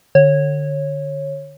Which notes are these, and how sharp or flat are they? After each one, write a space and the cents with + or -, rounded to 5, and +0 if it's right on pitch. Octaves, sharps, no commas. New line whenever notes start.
D3 +20 C#5 -15